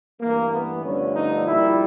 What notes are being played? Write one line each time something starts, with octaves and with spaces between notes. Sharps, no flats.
G2 E3 A3 A#3
B3
G2 D3 F3 A3 C#4
D#4
A#1 A#2 G3 E4